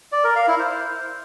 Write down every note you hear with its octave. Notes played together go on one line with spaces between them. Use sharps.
D5
A#4
F5
E4
C5